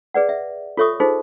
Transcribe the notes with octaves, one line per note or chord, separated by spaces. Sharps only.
G#4 B4 D5 F#5
E5
F4 A4 C#5 E5 C#6 D#6
D#4 F4 G#4 C5